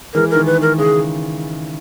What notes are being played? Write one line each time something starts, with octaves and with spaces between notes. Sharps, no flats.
E3 G#3 A#4
D#3 A#4
B4
D#3
A#4
C#3 G#4